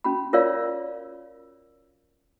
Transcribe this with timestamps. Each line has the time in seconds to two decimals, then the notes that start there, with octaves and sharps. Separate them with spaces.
0.04 C#4 F#4 B5
0.33 F4 A#4 C#5 D5 F5